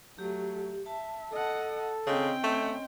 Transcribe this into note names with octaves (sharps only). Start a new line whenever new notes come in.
F#3 A3 G4
E5 A5
A4 D#5 F#5
C#3 C4 D#5 G5 C6
A3 C#4